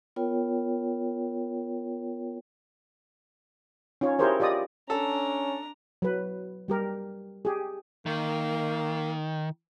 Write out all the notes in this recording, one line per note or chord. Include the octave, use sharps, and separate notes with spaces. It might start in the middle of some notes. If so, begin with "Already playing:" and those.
B3 F4 A#4 C#5 G5
C#4 D#4 F4 C#5
E4 G4 G#4 A#4 C5 C#5
F4 G4 D5 D#5 D#6
C#4 D4 A4 A#5
F#3 B4
G3 G4 A#4
G4 G#4
D#3 A#3